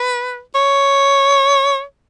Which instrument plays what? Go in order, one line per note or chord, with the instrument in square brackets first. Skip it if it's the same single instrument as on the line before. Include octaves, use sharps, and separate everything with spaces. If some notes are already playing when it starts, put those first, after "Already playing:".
Already playing: [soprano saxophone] B4
C#5